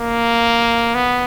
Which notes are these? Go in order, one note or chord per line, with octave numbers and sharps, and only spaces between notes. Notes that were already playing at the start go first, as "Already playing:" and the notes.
Already playing: A#3
B3